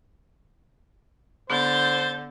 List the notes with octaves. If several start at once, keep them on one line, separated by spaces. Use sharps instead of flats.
D3 B3 C5 G6 A6